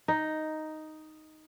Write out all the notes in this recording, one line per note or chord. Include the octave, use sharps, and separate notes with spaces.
D#4